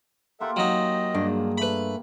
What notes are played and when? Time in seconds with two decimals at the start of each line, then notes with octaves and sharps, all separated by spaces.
0.40 A#3 F4 G4 A4 E5 F#5
0.56 F#3 D#4 D#5
1.15 G2 A#2 D4 G#4
1.58 A3 B4 B5